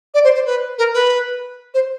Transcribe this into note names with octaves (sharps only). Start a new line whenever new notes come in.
D5
C5
C5
B4
A#4
B4
C5